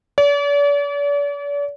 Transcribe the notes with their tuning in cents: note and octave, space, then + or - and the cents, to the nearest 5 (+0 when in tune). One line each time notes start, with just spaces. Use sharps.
D5 -40